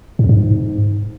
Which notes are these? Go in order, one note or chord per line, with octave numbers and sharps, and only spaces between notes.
G#2
E2
G#2